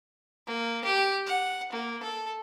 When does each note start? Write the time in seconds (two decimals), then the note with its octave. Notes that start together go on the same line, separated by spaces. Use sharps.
0.47 A#3
0.85 G4
1.27 F#5
1.73 A#3
2.03 A4